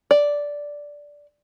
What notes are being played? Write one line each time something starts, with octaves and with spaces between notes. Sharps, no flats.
D5